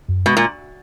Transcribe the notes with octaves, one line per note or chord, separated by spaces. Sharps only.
F#2
B2 G#3
A#2